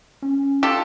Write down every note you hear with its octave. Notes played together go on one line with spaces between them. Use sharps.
C#4
F4 G4 A4